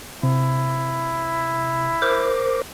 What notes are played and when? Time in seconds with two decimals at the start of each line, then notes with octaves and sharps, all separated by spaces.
0.23 C3 E4
2.02 A#4 C5 D6